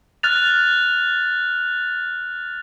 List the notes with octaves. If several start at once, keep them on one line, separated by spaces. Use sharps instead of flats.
F6 F#6 A6 F7